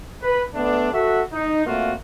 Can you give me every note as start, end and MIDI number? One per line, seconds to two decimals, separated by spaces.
0.23 0.43 71
0.55 0.92 57
0.55 0.92 59
0.55 0.92 62
0.93 1.22 66
0.93 1.22 69
0.93 1.22 76
1.33 1.65 63
1.67 1.93 46
1.67 1.93 57
1.67 1.93 58
1.67 1.93 60
1.67 1.93 65
1.67 1.93 66